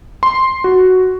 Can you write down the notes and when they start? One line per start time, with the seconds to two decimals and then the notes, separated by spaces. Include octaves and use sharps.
0.23 C6
0.64 F#4